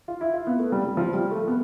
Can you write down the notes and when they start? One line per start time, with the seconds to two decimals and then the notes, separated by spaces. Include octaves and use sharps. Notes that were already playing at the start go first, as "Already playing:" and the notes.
0.08 F4
0.21 E4
0.33 F4
0.47 B3
0.59 A3
0.72 G3
0.85 G3
0.97 F3
1.14 G3
1.31 A3
1.48 B3